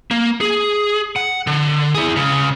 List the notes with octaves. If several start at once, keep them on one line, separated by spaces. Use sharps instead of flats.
A#3
G#4
F#5
D3
E4 G#4
C#2 C#3